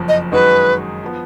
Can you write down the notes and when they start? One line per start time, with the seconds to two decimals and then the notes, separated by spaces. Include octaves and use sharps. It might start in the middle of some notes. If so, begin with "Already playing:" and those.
Already playing: F#1 F2 F3
0.09 D#5
0.32 F#2 D#3 G#3 D#4 F#4 B4
1.04 F3 B3